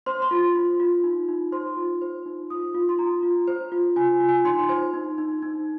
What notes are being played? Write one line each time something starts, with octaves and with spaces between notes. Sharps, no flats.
C5 C6
C6
F4
F4
F4
D#4
D#4
C5 C6
F4
C5
D#4
F4 D#6
F4
C6
F4 A#5
F4
C5
F4
F4 G#5
F4
G#5
D#4 C6
C5
D#4
D#4
D#4